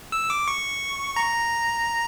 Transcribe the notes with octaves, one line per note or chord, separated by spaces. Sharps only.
E6
D6
C#6
A#5